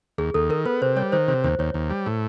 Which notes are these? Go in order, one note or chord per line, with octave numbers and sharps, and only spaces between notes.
D#2 G#4
D#2 A4
D#3 A#4
B3 B4
C3 C5
G3 C#5
D#3 C5
C3 C5
D#2 C5
D#2 C#5
D#2
G3
A2